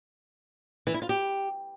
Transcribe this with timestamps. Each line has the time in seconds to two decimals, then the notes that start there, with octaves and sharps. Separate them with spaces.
0.87 E3
0.94 E4
1.02 F4
1.09 G4